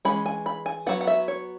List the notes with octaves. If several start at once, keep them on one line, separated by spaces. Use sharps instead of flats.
E3 G#3 C#4 B5
G#5
B5
G#5
F#3 B3 F#5
F#5
E5
C#5